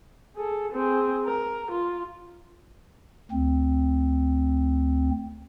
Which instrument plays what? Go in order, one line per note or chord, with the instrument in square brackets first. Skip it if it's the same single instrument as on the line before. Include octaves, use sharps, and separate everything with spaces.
[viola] G#4 A4
C4 G#4
A#4
F4
[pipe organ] D2 C4